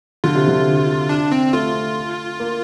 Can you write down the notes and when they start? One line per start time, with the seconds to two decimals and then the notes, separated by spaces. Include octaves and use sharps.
0.24 D3 F4
0.35 C3
0.48 D3
1.09 D4
1.32 C4
1.53 A3 F4
2.40 A#3